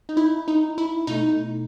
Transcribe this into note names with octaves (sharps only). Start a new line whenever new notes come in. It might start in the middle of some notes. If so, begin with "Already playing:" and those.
D#4
E4
D#4
E4
B2 A3 D#4